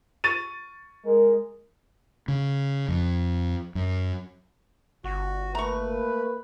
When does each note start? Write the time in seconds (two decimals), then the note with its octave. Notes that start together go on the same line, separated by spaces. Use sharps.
0.24 C#6 A6 D#7
1.05 G#3 A#4
2.28 C#3
2.88 F2
3.75 F#2
5.04 G1 F#4
5.55 A3 A#3 B4 A#5 C#6